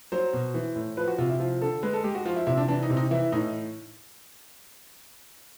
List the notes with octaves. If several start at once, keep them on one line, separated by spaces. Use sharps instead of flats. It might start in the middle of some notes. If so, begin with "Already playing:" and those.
F#3 C5
B2
E3
A2
F3 B4
F#4
C3 F4
E4
F3 F4
D3 A4
G#3 B4
A4
G#3 G4
F#4
F3 F4
E4
C3 E4
D4
E3 D4
D#4
C3
D#4
E3 E4
A2 D#4